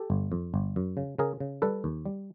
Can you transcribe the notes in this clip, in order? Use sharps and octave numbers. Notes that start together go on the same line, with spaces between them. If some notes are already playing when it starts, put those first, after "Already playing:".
Already playing: G4 A4
G1
F2
G1
F#2
C#3
C#3 G#4 A#4
C#3
G3 A4 B4
D#2
G3